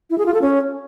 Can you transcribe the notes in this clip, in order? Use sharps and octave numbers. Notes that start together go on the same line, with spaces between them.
E4
G#4
F4
A4
C#4